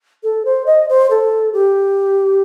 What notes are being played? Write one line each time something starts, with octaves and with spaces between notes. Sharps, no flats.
A4
C5
D#5
C5
A4
G4